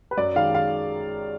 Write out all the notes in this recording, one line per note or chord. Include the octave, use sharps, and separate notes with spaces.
B4
F#2 D5
D#3 G#3 F5
F5